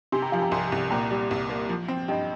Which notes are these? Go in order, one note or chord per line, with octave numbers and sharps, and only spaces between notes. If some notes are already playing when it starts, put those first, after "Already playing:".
C3 G#5 C6
G5 A#5
F3 F5 G#5
G5 A#5
C2 G#5 C6
C2
A#2 G5 A#5
G3
C2
A#3
F3
C4
G2 D#5 G5